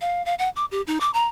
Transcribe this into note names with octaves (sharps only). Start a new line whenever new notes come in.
F5
F5
F#5
D6
G4
D#4
D6
A#5